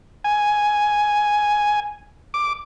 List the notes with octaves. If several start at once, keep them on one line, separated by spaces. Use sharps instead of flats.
G#5
D6